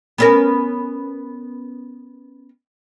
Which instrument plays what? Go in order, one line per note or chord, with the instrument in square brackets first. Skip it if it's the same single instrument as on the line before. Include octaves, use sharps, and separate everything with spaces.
[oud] B3 C#4 A#4